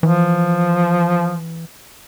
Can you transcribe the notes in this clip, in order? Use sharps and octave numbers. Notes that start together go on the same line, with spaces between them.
E3 F3